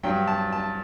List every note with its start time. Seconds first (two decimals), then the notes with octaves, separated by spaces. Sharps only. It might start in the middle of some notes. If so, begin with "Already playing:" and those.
0.03 G2 F#3 G5
0.28 A5
0.52 A5